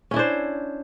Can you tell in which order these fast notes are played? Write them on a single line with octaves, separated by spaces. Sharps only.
C#4 E4 D4 C5